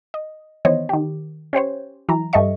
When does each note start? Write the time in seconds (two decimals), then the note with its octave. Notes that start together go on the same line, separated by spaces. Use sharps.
0.14 D#5
0.65 D#3 E3 B3 C5 C#5 D#5
0.89 D#3 G4
1.53 C#4 G4 C5 C#5
2.09 E3 F#3 A#5
2.33 G2 G4 A4 D#5 E5 C#6